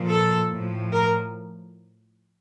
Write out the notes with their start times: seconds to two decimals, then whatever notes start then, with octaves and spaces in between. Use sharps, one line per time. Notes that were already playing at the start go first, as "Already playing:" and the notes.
Already playing: A#2 F3
0.08 A4
0.50 A2 F3
0.91 A#4